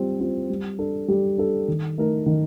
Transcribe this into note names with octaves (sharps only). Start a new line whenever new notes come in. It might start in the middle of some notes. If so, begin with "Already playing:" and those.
Already playing: G3 C4 F4
C4 F4
G3
D4 A4
G3
D4 A4
D#3
A3 D#4 A#4
D#3